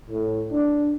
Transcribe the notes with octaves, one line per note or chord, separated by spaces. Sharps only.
A2
D4